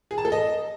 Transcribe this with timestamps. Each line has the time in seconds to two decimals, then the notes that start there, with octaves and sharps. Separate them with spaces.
0.11 G#4
0.18 A5
0.25 A4
0.32 D#5